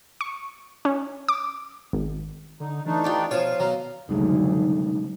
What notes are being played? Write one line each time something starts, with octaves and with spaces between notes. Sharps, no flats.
C#6
C#4
D6
G#1
D3 D#4
E3 A3 D4 D#4
F4 G4 D5
B2 F3 F4 C#5 F5
B2 F#3 F5 A#5
F#1 D2 C3 G3 G#3 D#4